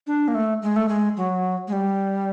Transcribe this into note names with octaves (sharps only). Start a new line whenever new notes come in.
D4
A#3
A3
G#3
A3
G#3
F#3
G#3
G3